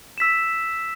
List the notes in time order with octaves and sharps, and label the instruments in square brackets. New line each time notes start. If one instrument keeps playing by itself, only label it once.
[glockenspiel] E6 B6 E7